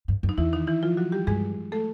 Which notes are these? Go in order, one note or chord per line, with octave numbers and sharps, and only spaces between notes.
G2
F#2
D#4
E2 E3 E4
D#3 D#4
E3 E4
F3 F4
F#3 F#4
G3 G4
G2 G#3 G#4
A3 A4